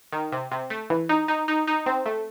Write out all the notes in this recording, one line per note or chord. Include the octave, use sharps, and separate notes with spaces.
D#3
C3
C3
A3
E3
D#4
D#4
D#4
D#4
C4
A3